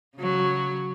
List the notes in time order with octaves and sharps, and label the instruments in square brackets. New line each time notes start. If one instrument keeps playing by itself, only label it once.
[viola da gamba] C#3 F#3